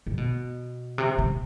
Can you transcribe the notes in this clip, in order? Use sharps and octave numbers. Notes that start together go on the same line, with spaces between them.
C3
B2
C3
C3